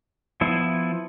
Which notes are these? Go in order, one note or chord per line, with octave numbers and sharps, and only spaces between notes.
F3 B3 E4